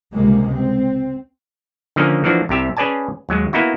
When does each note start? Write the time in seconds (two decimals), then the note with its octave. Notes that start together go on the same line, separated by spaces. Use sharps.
0.13 C#2 C3 G3 G#3 A#3
0.52 C4
1.96 D3 D#3 F3 A#3 C#4 D#4
2.24 E3 F3 A#3 D4 F#4
2.49 C2 C3 G4 E5
2.77 C#4 G#4 B4 D5 G#5 A5
3.29 D#2 F#3 G#3
3.53 A#3 B3 D#4 E4 F#4